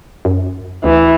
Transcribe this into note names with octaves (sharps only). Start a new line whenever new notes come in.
F#2
D2 E3